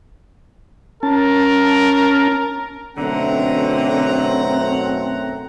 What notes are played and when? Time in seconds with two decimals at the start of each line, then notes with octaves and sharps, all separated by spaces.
1.03 C#4 A#4 A5
2.97 B1 F#2 D3 A3 C4 F#5 A#5